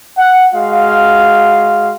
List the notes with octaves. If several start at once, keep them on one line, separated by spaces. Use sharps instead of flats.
F#5
G#3 F#4 F5